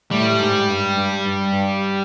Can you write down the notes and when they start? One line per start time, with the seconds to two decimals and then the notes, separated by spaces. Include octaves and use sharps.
0.11 A2 G3
0.40 G#2
0.69 G2
0.96 G2
1.25 G2
1.52 G2